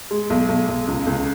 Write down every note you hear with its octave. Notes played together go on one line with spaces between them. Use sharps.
G#3
B1
B1
B1
C#2
C#2